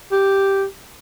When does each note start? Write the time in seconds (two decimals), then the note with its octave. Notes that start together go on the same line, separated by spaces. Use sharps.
0.11 G4